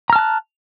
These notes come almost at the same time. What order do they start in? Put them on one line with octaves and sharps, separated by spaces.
A#5 F6 A5 F#6